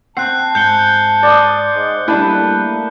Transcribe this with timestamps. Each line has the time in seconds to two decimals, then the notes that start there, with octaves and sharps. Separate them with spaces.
0.17 C4 F#5 A5 F#6 C7
0.55 G#2 G6 C#7 G7
1.23 D5 C6 D#6
1.74 G#2
2.08 G3 A3 A#3 D4 E4 B4 A5